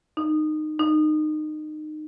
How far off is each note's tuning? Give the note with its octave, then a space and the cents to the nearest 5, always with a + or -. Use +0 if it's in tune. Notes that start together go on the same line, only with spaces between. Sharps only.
D#4 -20
D#4 -25